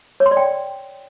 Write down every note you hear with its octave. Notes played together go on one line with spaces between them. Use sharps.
C#5
C6
D5
G5